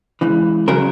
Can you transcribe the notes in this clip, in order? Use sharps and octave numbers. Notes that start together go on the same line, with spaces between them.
C#2 C#3 E3
C#3 F#3 A#4